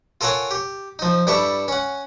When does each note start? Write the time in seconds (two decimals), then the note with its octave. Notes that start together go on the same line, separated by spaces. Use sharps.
0.21 F4 A4 A#4 C#5 F#5 G#5
0.51 G4
0.99 F3 D#4
1.27 G2 G3 E4 A4 E5 C#6
1.68 C#4 F#5